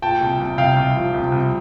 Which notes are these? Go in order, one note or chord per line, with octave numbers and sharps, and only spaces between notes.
A#2 G5 A5
C2
C2
C2 F5 G5
C2
F3
C2
C2